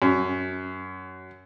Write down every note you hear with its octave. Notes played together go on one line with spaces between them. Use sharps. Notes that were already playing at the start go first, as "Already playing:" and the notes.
F#2